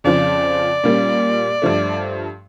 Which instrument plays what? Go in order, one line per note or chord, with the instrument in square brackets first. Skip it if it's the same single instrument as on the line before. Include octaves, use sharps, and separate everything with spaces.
[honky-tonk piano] F2 C#3 F3 [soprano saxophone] D5
[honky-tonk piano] A#2 G3 A#3 C#4
G2 F3 A3